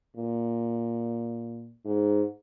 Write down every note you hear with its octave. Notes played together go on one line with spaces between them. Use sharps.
A#2
G#2